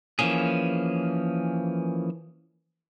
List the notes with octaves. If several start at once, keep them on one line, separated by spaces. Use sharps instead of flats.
E3 F3 A#3 C#4 G#4